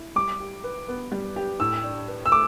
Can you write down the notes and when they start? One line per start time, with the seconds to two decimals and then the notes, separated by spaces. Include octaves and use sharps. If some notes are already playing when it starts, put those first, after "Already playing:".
Already playing: E4
0.16 G3 D6
0.40 G4
0.64 B4
0.88 B3
1.12 G3
1.36 G4
1.60 A2 E6
1.83 D4
2.08 B4
2.26 E6
2.32 A3 D6